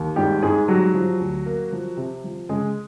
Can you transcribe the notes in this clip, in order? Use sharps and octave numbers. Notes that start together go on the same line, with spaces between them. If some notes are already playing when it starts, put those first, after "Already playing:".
Already playing: D#2
G#2 G3 G4
G#2 G#3 G#4
F#3 G3 F#4
F3
D2
A#3
F3
C3
F3
C#3 G#3 G#4